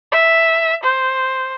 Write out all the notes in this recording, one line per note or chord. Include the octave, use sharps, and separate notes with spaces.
E5
C5